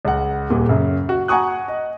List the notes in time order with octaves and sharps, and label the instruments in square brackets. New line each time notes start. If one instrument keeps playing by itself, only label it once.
[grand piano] C#2 F#5
D#1 A#2 G#4
F#2 C#3
F#4
F#5 G#5 A#5 C#6 D#6 F#6
D#5